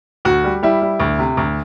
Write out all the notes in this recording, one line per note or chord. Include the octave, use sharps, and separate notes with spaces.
D2 F#4
G3
G3 E4
G3
D2
C3
D2